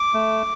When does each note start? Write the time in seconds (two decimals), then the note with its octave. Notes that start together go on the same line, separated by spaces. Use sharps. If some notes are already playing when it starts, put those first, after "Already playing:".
Already playing: D6
0.14 A3